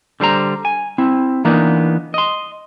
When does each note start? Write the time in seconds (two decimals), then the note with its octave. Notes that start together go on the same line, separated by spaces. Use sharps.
0.20 D3 G3 C5 A#5
0.65 G#5
0.98 C4 E4
1.45 E3 A#3 B3 D4 D#4
2.14 D#5 C6